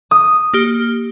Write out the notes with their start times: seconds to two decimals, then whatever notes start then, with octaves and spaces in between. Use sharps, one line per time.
0.11 D#6
0.54 A#3 G4 F6